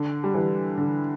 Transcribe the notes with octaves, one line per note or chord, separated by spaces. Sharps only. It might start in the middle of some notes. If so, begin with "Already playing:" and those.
Already playing: D3
G3
E3
D3